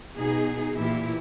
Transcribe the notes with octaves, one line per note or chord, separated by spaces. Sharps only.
B2 D#4 G#4
A#2 E3 E4 G4